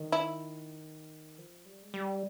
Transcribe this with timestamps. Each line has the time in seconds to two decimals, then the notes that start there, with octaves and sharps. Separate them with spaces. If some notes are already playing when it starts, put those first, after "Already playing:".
Already playing: D#3
0.12 E4
1.38 F3
1.66 G3
1.83 G#3
1.94 G3